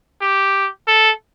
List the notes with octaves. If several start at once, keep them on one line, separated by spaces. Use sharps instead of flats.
G4
A4